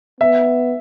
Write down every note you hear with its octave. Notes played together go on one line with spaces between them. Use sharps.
B3 E5